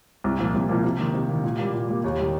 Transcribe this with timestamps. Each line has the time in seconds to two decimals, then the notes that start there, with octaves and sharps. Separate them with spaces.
0.24 C2
0.39 A#2 F3 A#3
0.54 C2
0.69 A#2 F3 A#3
0.84 C3
0.99 D#3 A#3
1.14 C3
1.29 D#3 A#3
1.44 A#2
1.59 G3 A#3
1.74 A#2
1.89 G3 A#3
2.04 D#2
2.18 D#3 G3